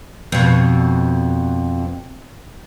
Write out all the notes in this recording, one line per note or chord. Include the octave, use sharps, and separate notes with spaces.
F2 B2